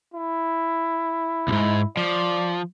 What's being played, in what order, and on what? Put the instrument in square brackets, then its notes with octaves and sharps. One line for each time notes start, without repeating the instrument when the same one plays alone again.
[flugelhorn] E4
[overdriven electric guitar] C2 G#2
[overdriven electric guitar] F3 [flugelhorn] D5